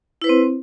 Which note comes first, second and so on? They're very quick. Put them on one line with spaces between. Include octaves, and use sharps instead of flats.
E4 B4 C5 C4